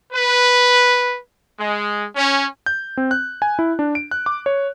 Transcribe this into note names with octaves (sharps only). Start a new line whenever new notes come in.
B4
G#3
C#4
G6
C4
F#6
G#5
E4
D4
D7
F#6
D6
C#5